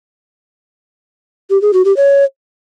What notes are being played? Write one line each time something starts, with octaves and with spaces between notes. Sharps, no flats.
G4
G#4
F#4
G4
C#5